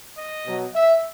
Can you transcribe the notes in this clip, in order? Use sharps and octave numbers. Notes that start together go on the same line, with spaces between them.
D#5
B2 F#3
E5